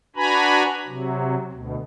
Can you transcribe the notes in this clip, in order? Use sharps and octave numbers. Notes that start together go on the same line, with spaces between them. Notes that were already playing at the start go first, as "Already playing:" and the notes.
D4 F#4 B4 G#5 A#5 B5
C3 F#3
D2 B2